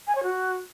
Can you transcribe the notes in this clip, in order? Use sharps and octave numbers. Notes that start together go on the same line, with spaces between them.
G#5
C#5
F#4